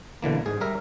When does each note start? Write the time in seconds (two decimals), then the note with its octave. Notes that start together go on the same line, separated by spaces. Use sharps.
0.22 B2 D3 E3 A#3
0.46 G#2 G#4
0.61 G3 A#4 E5